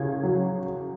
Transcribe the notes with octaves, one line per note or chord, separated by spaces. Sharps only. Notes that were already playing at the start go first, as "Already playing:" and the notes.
Already playing: C#3 G#6
F#3